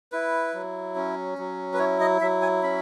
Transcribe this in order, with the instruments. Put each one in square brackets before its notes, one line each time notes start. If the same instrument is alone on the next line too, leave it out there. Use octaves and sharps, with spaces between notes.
[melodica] E4 B4
F#3
C#4
F#3
B4
E4 C#5
D#5
F#3 E5
G#5
C#4 B5